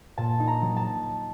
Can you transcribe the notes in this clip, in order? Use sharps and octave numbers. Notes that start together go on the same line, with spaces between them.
A#2 A5
D#4
A#5
F#3
A5